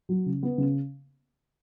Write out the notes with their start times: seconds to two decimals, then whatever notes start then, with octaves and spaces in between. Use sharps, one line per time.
0.09 F#3
0.26 C#3
0.43 B3
0.58 C#3